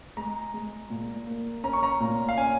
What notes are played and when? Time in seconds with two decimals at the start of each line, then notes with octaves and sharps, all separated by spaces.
0.17 G#3 A#5
0.54 G#3
0.90 A#2
1.27 A#3
1.64 C#4 A#5
1.73 C#6
1.83 A#5
2.00 A#2
2.29 F5
2.37 C#4 G#5